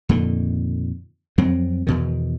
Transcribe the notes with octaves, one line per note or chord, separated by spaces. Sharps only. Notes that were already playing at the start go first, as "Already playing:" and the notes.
F2 A#2 D3 D#3
F2 F#3 C4
E2 B2 D#3